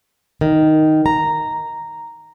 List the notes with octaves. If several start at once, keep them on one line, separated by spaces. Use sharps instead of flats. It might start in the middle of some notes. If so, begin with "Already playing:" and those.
D#3
A#5